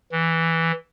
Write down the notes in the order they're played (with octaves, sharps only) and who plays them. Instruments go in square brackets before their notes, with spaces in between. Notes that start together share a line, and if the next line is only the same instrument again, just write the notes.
[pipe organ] E3